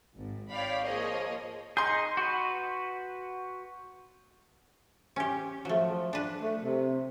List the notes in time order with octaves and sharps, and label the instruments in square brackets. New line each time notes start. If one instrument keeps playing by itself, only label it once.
[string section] G#1 G#2
C#5 D5 F5 G5 B5
F3 A#3 G#4 C#5 D#5
[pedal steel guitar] D#4 G#4 [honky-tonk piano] C6 G6
[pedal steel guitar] F#4 B4
[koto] C#4 G4
[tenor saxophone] F3 [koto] F#3 A3
[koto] D4 B4
[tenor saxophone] A3
C3